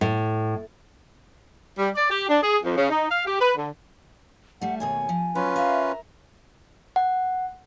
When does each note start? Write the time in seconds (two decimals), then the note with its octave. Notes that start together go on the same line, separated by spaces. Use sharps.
0.01 A2
1.77 G3
1.95 D5
2.10 G4
2.29 D4
2.43 G#4
2.63 F2
2.76 C#3
2.89 D#4
3.10 F5
3.26 G4
3.40 B4
3.56 D3
4.61 G3 A3 F#5
4.80 D#2 B2 C#5 G#5
5.09 F3
5.35 F#3 C#4 F4 B4
5.56 A#4 E5 F5
6.96 F#5